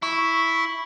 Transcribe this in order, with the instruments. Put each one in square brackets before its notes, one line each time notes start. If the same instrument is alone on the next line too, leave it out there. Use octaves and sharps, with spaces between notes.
[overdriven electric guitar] E4 [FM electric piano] C#6